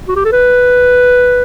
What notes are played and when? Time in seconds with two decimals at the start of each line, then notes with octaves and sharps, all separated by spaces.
0.08 F#4
0.16 G4
0.25 A4
0.32 B4